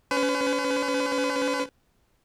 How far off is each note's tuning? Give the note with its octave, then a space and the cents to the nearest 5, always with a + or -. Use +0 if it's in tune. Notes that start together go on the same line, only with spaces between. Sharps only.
C#4 +25 B4 +40